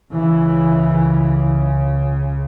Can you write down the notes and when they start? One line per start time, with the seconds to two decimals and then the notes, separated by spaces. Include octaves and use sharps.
0.12 C#2 C#3 E3